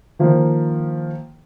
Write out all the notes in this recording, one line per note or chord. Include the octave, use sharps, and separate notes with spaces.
D#3 F3 A#3